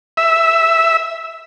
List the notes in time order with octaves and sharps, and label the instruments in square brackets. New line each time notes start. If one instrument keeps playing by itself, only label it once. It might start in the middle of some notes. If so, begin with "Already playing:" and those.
[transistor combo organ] E5